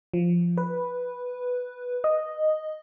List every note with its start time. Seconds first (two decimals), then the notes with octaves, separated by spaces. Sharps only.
0.14 F3
0.58 B4
2.04 D#5